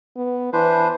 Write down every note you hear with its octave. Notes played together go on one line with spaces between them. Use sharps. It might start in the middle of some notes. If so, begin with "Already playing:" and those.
B3
E3 D4 B4 C5